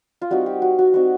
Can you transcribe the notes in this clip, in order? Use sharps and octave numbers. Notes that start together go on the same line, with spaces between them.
F4
G3 C4 D#4 F#4
G4
F#4
F#4
G3 C4 D#4 F#4